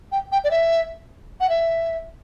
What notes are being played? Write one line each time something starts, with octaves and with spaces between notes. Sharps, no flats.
G5
G5
D5
E5
F#5
E5